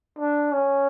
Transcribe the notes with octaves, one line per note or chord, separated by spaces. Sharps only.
D4
C#4